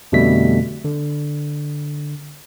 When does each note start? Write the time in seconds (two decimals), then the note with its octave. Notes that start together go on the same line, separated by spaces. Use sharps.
0.12 F2 B2 D3 G3 A3 B6
0.84 D3